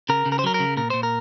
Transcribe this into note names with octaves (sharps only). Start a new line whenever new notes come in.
C#3 A#4
C#3
A#4
C5
F#3 A#4
A#4
C#3
A#2 A#4
A#2 C5
A#4